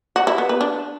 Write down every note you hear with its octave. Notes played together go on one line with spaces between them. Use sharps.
F#4
E4
B3
B4
D4